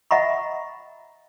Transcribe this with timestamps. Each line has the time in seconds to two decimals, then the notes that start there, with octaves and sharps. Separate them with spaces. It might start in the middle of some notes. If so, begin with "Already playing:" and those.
0.11 D#5 E5 F#5 A#5 B5 C#6